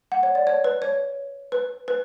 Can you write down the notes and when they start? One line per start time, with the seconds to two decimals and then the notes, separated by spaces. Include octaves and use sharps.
0.12 F#5
0.23 C#5
0.35 D5
0.47 C#5
0.64 B4
0.82 C#5
1.52 B4
1.88 B4